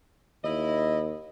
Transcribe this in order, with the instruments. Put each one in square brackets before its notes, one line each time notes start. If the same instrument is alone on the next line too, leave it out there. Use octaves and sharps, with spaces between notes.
[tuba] D#2 [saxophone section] E4 D#5